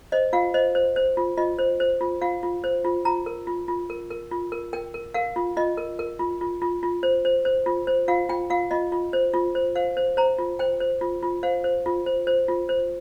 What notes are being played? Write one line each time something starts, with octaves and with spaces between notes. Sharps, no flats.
C5 D#5
F4 F5
C5 D#5
C5
C5
F4
F4 D#5
C5
C5
F4
F4 F5
F4
C5
F4
F4 A#5
A#4
F4
F4
A#4
A#4
F4
A#4
A#4 G5
A#4
A#4 F5
F4
F4 D#5
A#4
A#4
F4
F4
F4
F4
C5
C5
C5
F4
C5
F4 F5
F4 G5
F4 F5
F4 D#5
F4
C5
F4
C5
C5 F5
C5
C5 A#5
F4
C5 G5
C5
F4
F4
C5 F5
C5
F4
C5
C5
F4
C5